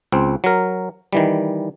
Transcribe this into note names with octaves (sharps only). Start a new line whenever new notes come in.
C#2 C4
F#3 A#4
D#3 E3 G3